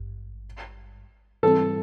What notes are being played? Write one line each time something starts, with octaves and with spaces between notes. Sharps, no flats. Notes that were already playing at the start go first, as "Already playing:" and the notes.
Already playing: G#1 G2
G#2 E3 G3 C4 A4